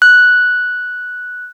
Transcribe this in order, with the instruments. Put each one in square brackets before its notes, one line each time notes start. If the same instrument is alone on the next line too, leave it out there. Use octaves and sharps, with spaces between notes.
[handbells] F#6